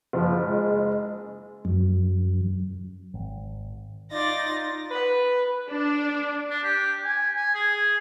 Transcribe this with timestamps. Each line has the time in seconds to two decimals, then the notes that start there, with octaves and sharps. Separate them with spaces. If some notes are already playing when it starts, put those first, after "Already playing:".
0.13 F#1 F3
0.44 G#3
1.65 F#2
3.14 G#1
4.11 D#4 F4 D5 A6 A#6
4.91 B4
5.69 D4
6.50 D4
6.64 G4
7.04 G#5
7.36 G#5
7.55 G#4